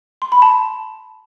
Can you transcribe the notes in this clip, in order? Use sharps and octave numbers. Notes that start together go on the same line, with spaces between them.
C6
B5
A5